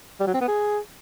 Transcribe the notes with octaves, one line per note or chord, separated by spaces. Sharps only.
G3
F#3
C4
B3
G#4